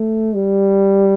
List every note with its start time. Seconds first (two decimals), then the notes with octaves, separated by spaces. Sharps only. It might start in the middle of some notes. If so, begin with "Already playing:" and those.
Already playing: A3
0.35 G3